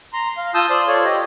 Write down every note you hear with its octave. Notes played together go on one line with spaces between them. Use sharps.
A#5 C6
F5
F4 A5 D#6 E6 G6
C5 D5 C6
F4 A4 C#5 D5
G4 D#5